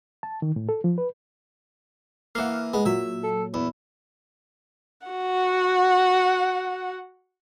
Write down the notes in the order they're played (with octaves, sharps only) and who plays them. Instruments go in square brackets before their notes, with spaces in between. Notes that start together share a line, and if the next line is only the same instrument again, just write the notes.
[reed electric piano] A5
D#3
A2
A4
F3
B4
[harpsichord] E3 A#3 [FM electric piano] F5 F#5
[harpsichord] G#3 [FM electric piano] B3
[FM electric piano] A#2 F#3 [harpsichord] E5
[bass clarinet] A4
[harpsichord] E2 [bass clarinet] E4
[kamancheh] F#4 F#5